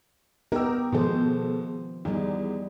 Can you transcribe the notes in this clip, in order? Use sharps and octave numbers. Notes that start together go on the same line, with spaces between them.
B3 D#4 G4 A#4 E6
B2 D#3 F3 G#3 A4 C5
E2 D#3 G3 D#4